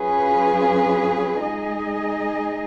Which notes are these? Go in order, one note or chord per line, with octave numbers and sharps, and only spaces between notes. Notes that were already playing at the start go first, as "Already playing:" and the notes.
Already playing: F#3 C#4 F4 G#4 B4
G#3 D#4 G#4 D#5